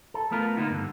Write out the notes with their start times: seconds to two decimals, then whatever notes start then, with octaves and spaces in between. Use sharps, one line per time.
0.14 A4
0.31 A3 B3 F4 A#4
0.57 D3 A#3 B3 D#4
0.70 G2 D3